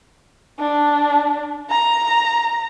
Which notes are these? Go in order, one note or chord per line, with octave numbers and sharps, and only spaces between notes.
D4
A#5